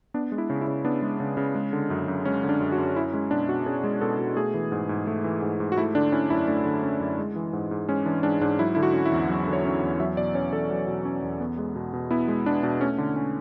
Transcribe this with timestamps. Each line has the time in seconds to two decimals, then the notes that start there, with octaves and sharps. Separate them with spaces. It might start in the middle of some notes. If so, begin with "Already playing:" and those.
0.14 B3 D4
0.32 G#3
0.38 E4
0.50 C#3
0.61 E4
0.67 C#3
0.85 B3 D4
1.02 G#3
1.20 C#3
1.37 C#3
1.55 G#3
1.73 D3
1.90 F#2
2.08 F#2
2.25 G#3 C#4
2.43 D3
2.49 D4
2.60 F#2
2.72 F#4
2.78 F#2
2.96 C#4 E4
3.13 G#3 C#4
3.31 B2 D4
3.49 B2 F#4
3.66 C#4 G#4
3.84 G#3
4.01 B2 A4
4.19 B2
4.36 A3 G#4
4.54 E3
4.72 G#2
4.89 G#2
5.07 A3
5.24 E3
5.42 G#2
5.60 G#2
5.72 F#4
5.78 A3 E4
5.95 D3 D4
6.12 C#4 E4
6.30 F#2 E4
6.47 A3 D4
6.65 D3
6.83 C#4
7.00 F#2
7.19 G#3
7.36 E3
7.53 G#2
7.71 G#2
7.88 G#3 C#4
8.06 E3 D4
8.23 G#2 D4
8.41 G#2 D4
8.59 F#3 E4
8.75 D3 E4
8.83 F#4
8.94 C#4
9.05 E4
9.12 E2
9.29 F#3
9.47 D3
9.53 C#5
9.65 C#4
9.82 E2
10.00 F#3 E5
10.17 B2 D5
10.35 C#4 C#5
10.53 E2 A4
10.70 F#3
10.87 B2
11.05 C#4
11.22 E2
11.40 B3
11.58 G#3
11.75 B2
11.94 B2
12.11 B3 E4
12.28 G#3
12.46 B2 D4
12.63 B2 D4
12.81 A3 C#4
12.98 D3
13.16 C#4